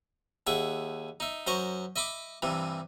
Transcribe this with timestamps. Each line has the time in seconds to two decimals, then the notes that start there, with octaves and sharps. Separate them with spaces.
0.47 D#2 G#4 E5 F#5
1.20 D#4 E5
1.47 F#2 C5 D#5 A#5 C#6
1.96 D#5 E5 B5 D6
2.42 G2 C3 E3